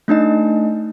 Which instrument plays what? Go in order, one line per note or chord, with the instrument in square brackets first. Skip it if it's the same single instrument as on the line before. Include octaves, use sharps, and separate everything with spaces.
[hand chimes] A3 D4 D#4 D#5